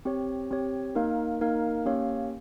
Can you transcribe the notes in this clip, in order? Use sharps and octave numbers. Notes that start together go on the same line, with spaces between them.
C4 G4 C#5
C4 G4 C#5
A#3 D#4 A#4 F5
A#3 D#4 A#4 F5
A#3 C#4 G4 C#5 F5